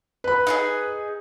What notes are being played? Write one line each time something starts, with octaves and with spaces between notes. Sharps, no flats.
B4 B5
D#4 F4 G#4